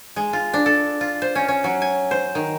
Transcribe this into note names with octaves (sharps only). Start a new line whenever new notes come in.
G#3
F4
D4
A4
F4
C5
C#4
C#4
F#3
G#5
C5
D#3